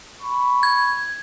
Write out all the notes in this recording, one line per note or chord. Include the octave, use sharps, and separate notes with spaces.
B5 C#6
G#6